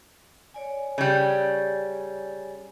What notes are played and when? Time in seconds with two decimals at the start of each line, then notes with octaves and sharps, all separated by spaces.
0.54 C#5 D5 G#5
0.98 C#3 G3